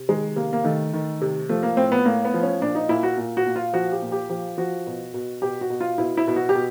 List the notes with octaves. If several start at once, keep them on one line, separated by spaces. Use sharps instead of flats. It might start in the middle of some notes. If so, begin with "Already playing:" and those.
Already playing: C3
D#3 G#3
C3 A#3
A#3
D#3 A3
D#3
C3
F3 A3
A#3
A2 C4
B3
A2 A#3
B3
F3
C#4
A#2 D4
D#4
A#2 E4
F#4
A#2
F#4
A#2
F4
F3 F#4
G4
A#2
G4
F3 G4
F3 F#4
B2
B2
B2 G4
F#4
B2
F4
B2 E4
E4
B2
F#4
G4
B2